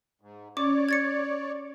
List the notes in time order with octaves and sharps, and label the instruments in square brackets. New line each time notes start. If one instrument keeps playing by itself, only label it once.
[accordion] G#2
[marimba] C#4 [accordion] C#5 D5 [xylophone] D6
[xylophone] G#6 A6 C#7